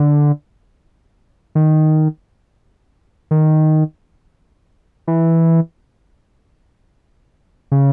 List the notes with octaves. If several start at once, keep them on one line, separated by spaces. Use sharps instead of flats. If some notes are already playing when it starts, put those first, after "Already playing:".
Already playing: D3
D#3
D#3
E3
C#3